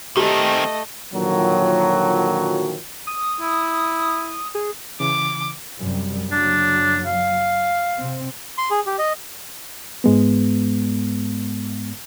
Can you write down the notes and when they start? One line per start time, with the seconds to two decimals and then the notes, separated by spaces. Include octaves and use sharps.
0.17 D#3 A3 C4 G4 D#5
1.14 A#2 D3 D#3 F3 F#3
3.07 D#6
3.41 E4
4.55 G#4
5.00 C#3 E3 D6
5.79 F#2 C3 G3
6.31 F#1 F#3 D4
7.06 F5
7.98 C3 C4
8.58 C6
8.71 G#4
8.86 G4
8.99 D#5
10.04 G#2 G#3 B3